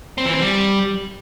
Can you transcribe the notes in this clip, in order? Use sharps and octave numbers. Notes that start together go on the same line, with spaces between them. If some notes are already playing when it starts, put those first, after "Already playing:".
C4
E3
C4
G3